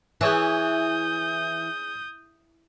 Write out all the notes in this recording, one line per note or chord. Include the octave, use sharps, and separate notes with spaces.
E3 G#4 C#5 A5 D#6 G6